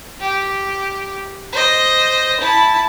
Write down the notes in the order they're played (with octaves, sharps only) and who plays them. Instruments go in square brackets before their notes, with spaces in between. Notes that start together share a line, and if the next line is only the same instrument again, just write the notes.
[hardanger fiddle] G4
C5 D#5
E4 A5